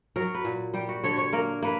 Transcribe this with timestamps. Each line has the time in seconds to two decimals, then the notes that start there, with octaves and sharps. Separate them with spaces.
0.16 F#3 A#4
0.35 B4
0.45 A#2
0.74 G3 G4
0.89 F#4
1.04 D3 C#5
1.18 C#5
1.33 A#3 A#4
1.63 A#3 B4